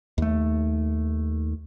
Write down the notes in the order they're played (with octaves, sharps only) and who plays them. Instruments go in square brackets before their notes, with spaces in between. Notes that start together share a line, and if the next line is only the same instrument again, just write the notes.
[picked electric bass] D#2 A3